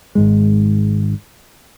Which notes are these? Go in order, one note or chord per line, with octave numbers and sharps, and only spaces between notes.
G#1 G#2 G#3